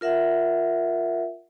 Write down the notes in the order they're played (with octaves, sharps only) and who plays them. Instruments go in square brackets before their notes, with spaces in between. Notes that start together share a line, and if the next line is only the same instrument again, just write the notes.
[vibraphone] F4 A#4 E5 F#5